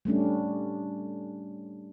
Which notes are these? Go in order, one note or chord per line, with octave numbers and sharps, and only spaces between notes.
G3 A3 C#4 D4